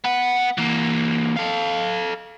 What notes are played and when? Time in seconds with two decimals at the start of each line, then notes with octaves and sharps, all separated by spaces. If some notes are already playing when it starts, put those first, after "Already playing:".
0.04 B3 F#5
0.58 E3 A#3
1.36 A4 F5